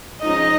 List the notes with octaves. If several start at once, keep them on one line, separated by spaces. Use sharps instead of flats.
F3 G#3 C#4 D#4 D#5